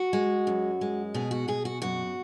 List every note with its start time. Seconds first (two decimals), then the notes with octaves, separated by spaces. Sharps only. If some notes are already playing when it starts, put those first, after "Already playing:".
Already playing: F#4
0.13 G#3
0.47 F#2
0.81 G#3
1.14 B2 G#4
1.31 F#4
1.48 B2 G#4
1.65 F#4
1.82 F#2 F#4